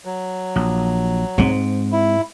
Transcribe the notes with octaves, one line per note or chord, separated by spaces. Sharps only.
F#3
A#1
G#2 G#3 C4
E4